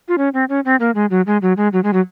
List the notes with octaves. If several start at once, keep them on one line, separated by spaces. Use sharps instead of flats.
F4
C#4
C4
C#4
C4
A#3
G#3
F#3
G#3
F#3
G#3
F#3
G#3
F#3